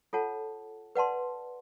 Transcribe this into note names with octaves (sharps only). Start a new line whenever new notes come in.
F4 A4 C#5 F#5 A5
B4 D5 F#5 A5 C6